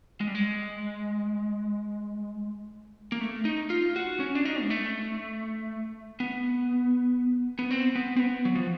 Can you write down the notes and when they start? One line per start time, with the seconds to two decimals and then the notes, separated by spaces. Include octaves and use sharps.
0.21 G#3
0.28 G3
0.35 G#3
3.12 A#3
3.21 A3
3.45 D#4
3.70 F4
3.96 F#4
4.20 C#4
4.35 D4
4.45 D#4
4.61 G#3
4.70 A3
6.20 B3
7.59 B3
7.71 C4
7.95 B3
8.16 C4
8.20 B3
8.45 F#3
8.56 F3